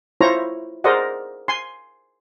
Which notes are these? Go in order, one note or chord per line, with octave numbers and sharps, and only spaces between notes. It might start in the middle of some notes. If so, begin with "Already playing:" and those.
E4 F4 C5 C#5 A#5
G#4 A#4 C5 D5 D#5 F#5
G#5 C6